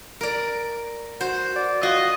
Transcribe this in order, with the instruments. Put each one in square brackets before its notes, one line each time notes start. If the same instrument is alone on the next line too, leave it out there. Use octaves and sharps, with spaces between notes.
[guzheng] A#4 D5
[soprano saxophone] F#4 [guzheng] C5
[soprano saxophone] D5
[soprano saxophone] F4 [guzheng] F#4 [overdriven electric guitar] D#5